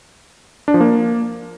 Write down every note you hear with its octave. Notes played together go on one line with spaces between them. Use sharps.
D4
F3
A#3